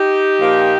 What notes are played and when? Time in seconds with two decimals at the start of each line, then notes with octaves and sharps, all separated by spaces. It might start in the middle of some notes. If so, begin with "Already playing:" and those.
Already playing: D#4 G4
0.40 A#2 F3 A#3